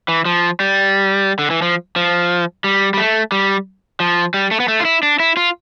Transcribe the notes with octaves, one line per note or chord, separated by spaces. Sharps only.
E3
F3
G3
D3
E3
F3
F3
G3
G3
A3
G3
F3
G3
A3
B3
A3
F4
E4
D4
E4
F4